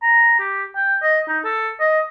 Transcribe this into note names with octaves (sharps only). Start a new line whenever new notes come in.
A#5
G4
G5
D#5
D#4
A4
D#5